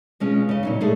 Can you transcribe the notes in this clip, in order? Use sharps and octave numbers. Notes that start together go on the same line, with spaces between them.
B2 G#3 C#4 F4
C#3 D#5
A#2 F#3 D#4
G#3 A3 G#4 A4